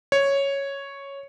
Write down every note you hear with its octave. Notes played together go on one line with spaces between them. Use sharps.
C#5